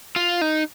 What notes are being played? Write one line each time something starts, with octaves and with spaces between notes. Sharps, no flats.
F4
D#4